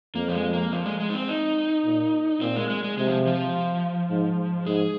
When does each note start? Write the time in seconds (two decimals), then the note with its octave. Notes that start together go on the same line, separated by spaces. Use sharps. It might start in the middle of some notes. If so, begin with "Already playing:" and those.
0.15 F2 A#3
0.28 F3
0.35 G#3
0.54 A#3
0.73 F3
0.86 G#3
1.00 G#3
1.10 D#4
1.14 C4
1.28 D#4
1.85 A#2
2.41 A#2 C4
2.56 G#3
2.69 G#3
2.84 G#3
2.98 C3 G#3
3.07 F3
3.27 F3
4.10 G#2
4.66 G#2 G#4